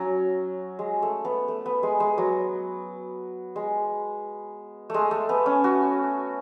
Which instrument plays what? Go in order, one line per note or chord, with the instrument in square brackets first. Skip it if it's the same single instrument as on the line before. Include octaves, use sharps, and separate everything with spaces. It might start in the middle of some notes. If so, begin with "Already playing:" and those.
Already playing: [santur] F#3 C#4
G#3
A3
B3
A3
B3
G#3
G#3
F#3
G#3
G#3 A3
A3
B3
C#4
F#4